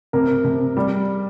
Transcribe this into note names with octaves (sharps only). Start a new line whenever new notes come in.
C3 A#4
C3
G3